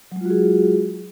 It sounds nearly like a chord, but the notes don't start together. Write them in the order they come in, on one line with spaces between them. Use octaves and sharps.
F#3 G#3 F4 F#4 G#4